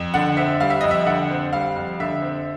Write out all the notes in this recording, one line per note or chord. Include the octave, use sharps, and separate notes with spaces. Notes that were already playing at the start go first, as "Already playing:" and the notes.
Already playing: F2
D3 F#5
C4 E5
G3 F5
E5
F2 D#5
E5
D3 F#5
C4
G3 F5
F2
D3 E5
C4